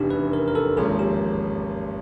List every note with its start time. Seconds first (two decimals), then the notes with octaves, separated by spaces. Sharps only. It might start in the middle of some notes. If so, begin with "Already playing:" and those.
Already playing: F1 E2 C#3 D4 D#4 G4
0.10 B4
0.33 A#4
0.48 A#4
0.55 A4
0.77 G#1 G#2 F3 A#3 C#4 G#4
0.99 G4